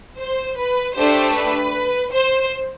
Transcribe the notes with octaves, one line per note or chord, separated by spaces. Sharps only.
C5
B4
A3 D4 G4 C5
B4
C5